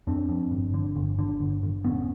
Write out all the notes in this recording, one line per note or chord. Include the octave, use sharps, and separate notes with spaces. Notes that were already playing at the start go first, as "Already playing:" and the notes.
F2 C4 D4
F2
G1
D3
G1
D3
G1
G1
E1 B3 C#4